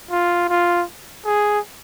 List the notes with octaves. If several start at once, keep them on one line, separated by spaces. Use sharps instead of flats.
F4
F4
G#4